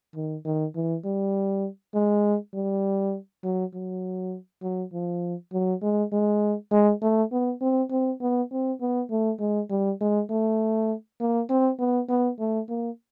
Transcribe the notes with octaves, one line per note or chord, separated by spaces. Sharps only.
D#3
D#3
E3
G3
G#3
G3
F#3
F#3
F#3
F3
F#3
G#3
G#3
G#3
A3
B3
C4
C4
B3
C4
B3
A3
G#3
G3
G#3
A3
A#3
C4
B3
B3
A3
A#3